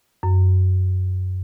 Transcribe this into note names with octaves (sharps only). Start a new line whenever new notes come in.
F#2